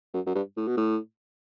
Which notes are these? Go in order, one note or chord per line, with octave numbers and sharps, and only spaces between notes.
F#2
F#2
G2
A2
B2
A2